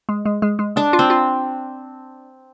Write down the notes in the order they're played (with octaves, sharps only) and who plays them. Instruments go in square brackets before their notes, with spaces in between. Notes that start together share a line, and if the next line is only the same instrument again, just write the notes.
[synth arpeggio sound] G#3
G#3
G#3
G#3
[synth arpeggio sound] G#3 [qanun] D4
[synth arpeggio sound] F4
[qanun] C4
[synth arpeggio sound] F4